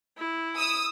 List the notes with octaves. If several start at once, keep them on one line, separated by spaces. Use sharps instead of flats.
E4
D#6 E6